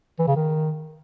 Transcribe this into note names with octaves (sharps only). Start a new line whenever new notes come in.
E3
C#3
D#3